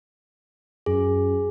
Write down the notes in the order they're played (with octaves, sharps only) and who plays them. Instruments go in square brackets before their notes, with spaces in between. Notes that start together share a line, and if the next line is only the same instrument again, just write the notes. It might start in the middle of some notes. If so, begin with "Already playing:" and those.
[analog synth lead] F#2 [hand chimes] G#4